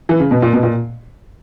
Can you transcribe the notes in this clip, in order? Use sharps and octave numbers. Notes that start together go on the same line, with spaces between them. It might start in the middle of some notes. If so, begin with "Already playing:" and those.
E3
C#3
B2
A#2
B2
A#2